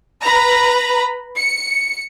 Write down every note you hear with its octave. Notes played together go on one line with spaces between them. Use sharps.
B4 A#5 B5
C#7